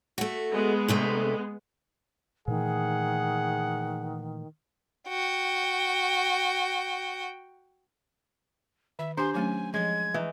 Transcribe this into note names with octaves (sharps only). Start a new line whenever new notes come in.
A3 F#4
G#3 B3
D2 C3 A3
A#2 D#3 E3 A3 G#4 F#5
F#4 G5
D#3 E5
D4 G4 C5 G#5 C6
F#3 A3 C#4 G#5
F3 G#3 D#5 G#6
E3 D#4